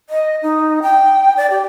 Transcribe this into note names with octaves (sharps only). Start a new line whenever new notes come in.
D#5
D#4
G5
D5
G4